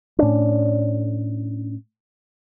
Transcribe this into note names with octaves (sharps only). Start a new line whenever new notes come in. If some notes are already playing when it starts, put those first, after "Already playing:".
A2 C#4 D4